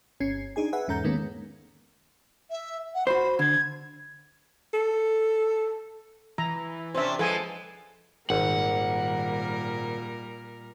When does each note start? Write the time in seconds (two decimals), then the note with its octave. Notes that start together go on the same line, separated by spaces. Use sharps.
0.20 G1 C#4 G#6 C7
0.56 D4 D#4 G#4 G#5
0.73 B4 E5 F#5 G#5
0.88 E2 G#2 C#4 A4 A#5 G6
1.04 D3 D#3 G#3 A#3 B3 C#4
2.50 E5
2.94 F#5
3.07 F#4 C5 B5
3.39 D3 G#6
4.74 A4
6.38 E3 A#5
6.95 C3 C#4 D4 C5 E5
7.19 F3 G#3 A4 B4 G#5
8.30 G#1 A#2 G3 A#4 F#5